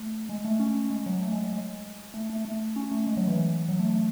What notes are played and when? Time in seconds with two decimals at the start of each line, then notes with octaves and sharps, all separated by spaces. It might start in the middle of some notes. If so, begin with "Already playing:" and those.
Already playing: A3
0.29 G#3
0.45 A3
0.59 C#4
0.90 G#3
1.06 F#3
1.21 A3
1.32 G#3
1.42 F#3
1.52 G#3
2.14 A3
2.30 A3
2.45 A3
2.76 C#4
2.91 A3
3.07 G#3
3.17 F#3
3.27 E3
3.68 F#3
3.79 A3
3.89 A3